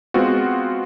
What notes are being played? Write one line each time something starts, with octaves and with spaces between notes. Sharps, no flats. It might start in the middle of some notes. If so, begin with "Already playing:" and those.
G#3 B3 C4 F4 F#4